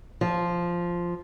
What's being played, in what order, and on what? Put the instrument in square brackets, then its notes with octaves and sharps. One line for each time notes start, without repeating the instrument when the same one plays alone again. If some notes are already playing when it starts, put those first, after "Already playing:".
[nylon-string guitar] F3